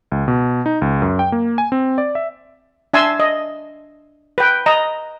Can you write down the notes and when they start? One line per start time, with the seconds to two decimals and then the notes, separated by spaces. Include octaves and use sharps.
0.12 C#2
0.28 B2
0.66 D#4
0.82 C#2
1.02 F#2
1.19 G5
1.32 A#3
1.58 G#5
1.72 C4
1.98 D5
2.15 E5
2.94 D4 E5 G#5 A5 C6 E6
3.20 D#5
4.38 B4 G5
4.66 D#5 A#5